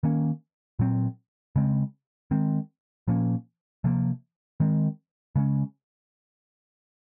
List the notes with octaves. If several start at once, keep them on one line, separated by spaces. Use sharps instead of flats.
D#3 A#3 C#4
A#2 F#3 C4
C#3 G#3 C4
D#3 G#3 C4
A#2 F3 A#3 C#4
C3 F3 A#3
D#3 G#3 C4
C#3 G#3 C#4